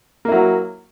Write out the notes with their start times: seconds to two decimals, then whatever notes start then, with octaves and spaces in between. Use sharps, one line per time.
0.25 A#3
0.28 E4
0.32 F#3